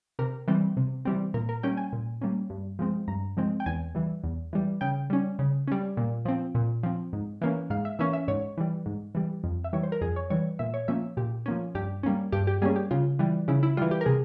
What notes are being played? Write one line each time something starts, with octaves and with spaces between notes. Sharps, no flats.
C3 A#4
E3 G3 C4
C3
E3 G3 C4
A#2 A#4
A#4
G3 A#3 C#4 G5
G#5
A#2
G3 A#3 C#4
G2
F3 G#3 C4
G2 A#5
F3 G#3 C4
G5
E2 G#5
E3 G3
E2
E3 G3
C#3 G5
G3 C#4
C#3
G3 C#4
A#2
F3 C4
A#2
F3 C4
G#2
E3 A#3 C#4
G#2 F5
E5
E3 A#3 C#4 E5
E5
G#2 C#5
E3 G3
G#2
E3 G3
F2
E5
E3 G3 C#5
C5
A#4
F2 G#4
C#5
E3 G3 C#5
A#2 E5
C#5
F3 A#3 C#4 E5
A#2 G4
F3 A#3 C#4
G2 G4
G3 A#3 C#4
G2 G4
G4
G3 A#3 C#4 G#4
G4
C#3 F4
E3 G3
C#3 E4
E4
E3 G3 F4
G4
A#4
C3 G#4